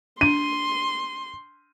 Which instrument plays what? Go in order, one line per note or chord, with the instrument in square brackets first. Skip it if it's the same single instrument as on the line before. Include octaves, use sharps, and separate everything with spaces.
[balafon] D4 [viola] C6 [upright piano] D#7